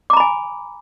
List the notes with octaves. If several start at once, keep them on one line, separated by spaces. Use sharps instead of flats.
G#5 A#5 B5 D6